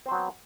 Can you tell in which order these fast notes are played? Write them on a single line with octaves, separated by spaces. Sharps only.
C4 C5 F#3 B3